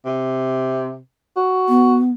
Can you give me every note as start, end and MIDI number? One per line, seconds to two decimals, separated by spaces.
0.06 0.98 48
1.37 1.98 66
1.69 2.11 59